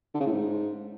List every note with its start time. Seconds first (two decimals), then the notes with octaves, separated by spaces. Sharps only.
0.14 D3
0.20 C#3
0.26 A2
0.32 G#2